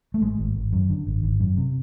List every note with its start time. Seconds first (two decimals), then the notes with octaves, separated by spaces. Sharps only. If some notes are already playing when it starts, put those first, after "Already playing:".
0.14 A3
0.21 G#1 G#3
0.39 G#1
0.56 G#1
0.73 F#2
0.90 D3
1.07 G#1
1.23 G#1
1.40 F#2
1.57 C3